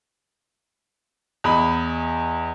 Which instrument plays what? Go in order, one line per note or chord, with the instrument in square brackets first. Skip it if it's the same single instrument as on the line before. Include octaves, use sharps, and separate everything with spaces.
[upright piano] E2 D#5 B5